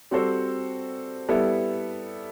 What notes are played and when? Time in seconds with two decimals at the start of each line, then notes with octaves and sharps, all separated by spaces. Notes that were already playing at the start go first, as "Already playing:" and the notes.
0.11 G3 C4 F#4 A4 C5
1.29 G3 B3 E4 A4